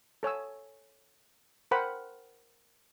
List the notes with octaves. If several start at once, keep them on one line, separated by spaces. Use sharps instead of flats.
A4 C#5 G#5 E6
A#4 C5 F#5 G5 B5